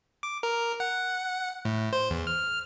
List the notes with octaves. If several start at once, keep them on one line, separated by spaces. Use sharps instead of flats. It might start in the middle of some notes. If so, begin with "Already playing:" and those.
D6
A#4
F#5
A2
C5
E2
F6